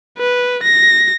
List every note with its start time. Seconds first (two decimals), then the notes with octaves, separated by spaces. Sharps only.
0.19 B4
0.63 A#6